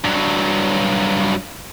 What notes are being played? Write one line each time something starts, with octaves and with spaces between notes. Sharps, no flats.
G2 F#3